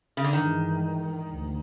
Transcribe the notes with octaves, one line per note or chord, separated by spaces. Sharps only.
C#3
D3
G2 D#3 E3 G#3
D2